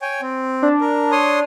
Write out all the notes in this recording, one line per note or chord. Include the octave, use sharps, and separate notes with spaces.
C#5 G5 G#5
C4
D4
A#4
C#5 C6 D#6